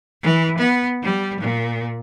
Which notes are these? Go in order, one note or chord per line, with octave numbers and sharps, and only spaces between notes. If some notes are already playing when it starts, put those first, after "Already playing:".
E3
B3
G3
A#2